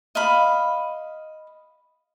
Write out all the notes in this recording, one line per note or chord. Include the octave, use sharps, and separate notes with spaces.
D#5 F5 B5